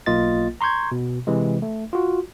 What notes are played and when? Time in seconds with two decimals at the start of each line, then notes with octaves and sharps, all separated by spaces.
0.06 B1 A#3 F4 D#5 A6
0.61 A#5 C6 C#6 G6 G#6
0.91 B2
1.27 C3 E3 G#3
1.62 A3
1.93 F4 F#4